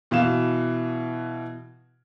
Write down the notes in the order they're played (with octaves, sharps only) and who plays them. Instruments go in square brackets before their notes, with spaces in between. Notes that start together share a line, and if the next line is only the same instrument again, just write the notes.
[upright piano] B2 E3 F5 E7